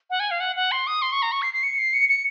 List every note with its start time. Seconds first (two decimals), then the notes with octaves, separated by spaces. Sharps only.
0.10 F#5
0.20 G#5
0.31 F5
0.40 F#5
0.56 F#5
0.72 C6
0.87 D#6
1.02 C6
1.12 C#6
1.22 A#5
1.32 C#6
1.42 C7
1.53 C7
1.63 C#7
1.78 C7
1.93 C#7
2.09 C#7